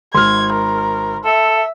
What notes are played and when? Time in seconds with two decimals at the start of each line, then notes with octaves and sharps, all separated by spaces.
0.15 G#1 C6 F6 G#6
0.53 A#4
1.25 A4 E5